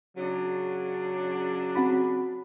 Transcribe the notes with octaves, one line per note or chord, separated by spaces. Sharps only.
C#3 F#3 D4
C4 F#4 B5